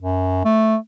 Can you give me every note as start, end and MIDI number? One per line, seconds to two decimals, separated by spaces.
0.01 0.41 42
0.45 0.76 57